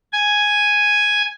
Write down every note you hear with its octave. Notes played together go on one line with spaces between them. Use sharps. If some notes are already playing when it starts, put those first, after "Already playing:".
G#5